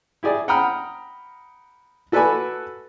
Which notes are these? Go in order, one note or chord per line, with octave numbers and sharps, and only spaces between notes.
E4 G4 G#4 D5
F#5 G5 A#5 B5 D#6 F6
F#4 A4 B4 D5 G#5 B5